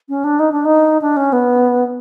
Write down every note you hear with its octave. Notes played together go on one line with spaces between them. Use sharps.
C#4
D4
D#4
D4
D#4
D4
C#4
B3